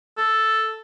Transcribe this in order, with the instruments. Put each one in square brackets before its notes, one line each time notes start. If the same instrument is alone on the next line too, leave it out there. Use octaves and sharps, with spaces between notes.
[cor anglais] A4